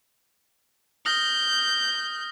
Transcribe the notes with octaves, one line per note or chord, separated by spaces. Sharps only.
D#6 F6 G6 A#6